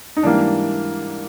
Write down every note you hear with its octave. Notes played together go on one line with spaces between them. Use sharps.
D#4
G#2 E3 G3 A#3 D4